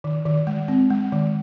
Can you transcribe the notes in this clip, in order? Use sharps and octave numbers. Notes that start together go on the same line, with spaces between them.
D#3
D#3
G#3
C4
G#3
D#3